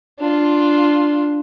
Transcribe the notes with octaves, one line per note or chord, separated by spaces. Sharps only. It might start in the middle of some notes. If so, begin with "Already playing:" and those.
D4 F4